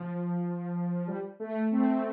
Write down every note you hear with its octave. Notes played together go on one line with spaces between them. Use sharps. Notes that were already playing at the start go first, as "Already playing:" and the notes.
Already playing: F3
G3
A3
C4